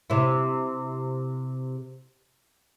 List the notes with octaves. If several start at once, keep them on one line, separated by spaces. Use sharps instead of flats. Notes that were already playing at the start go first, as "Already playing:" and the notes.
C3 E4